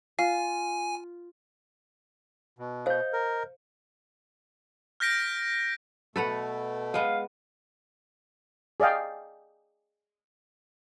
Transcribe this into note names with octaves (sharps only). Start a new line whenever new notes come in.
F4 F5 G#5
B2
C5 D#5 F5 G6
A#4
F6 G6 A#6 B6 D7
B2 A3 A4 B4 F#5
G#3 B3 F5
G#4 D5 D#5 F5 G5